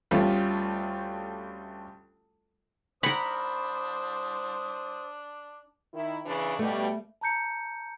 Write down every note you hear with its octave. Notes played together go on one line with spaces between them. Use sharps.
D2 G3 A3 C#4 F4
D4 A#4 C5 F#5 B5 D#6
D#3 E4
C#3 E3 D4
B2 G3 A3
A5 A#5 G6 C#7